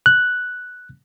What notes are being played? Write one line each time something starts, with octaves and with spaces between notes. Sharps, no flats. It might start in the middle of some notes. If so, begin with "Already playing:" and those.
F#6